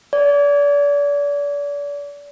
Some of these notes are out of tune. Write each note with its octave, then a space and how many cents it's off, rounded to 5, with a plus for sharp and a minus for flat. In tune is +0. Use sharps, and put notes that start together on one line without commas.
D5 -35